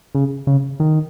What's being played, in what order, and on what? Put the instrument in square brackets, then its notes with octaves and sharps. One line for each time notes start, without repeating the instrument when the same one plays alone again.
[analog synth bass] C#3
C#3
D#3